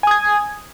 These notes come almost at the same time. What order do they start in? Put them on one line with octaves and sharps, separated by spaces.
G#5 D#6 G#6